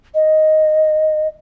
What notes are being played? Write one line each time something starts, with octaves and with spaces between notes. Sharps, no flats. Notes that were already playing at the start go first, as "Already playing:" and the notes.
D#5